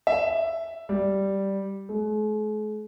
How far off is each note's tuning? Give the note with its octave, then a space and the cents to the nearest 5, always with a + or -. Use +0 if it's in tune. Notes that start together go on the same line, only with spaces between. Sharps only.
E5 +5
G3 -5
G#3 +45